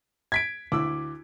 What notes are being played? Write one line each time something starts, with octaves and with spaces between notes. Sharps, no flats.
G#6 B6 D7
D2 E4 D6 E6